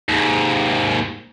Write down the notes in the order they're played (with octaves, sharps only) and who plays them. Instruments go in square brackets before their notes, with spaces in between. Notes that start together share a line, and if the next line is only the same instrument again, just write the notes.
[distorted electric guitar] D#2 G#2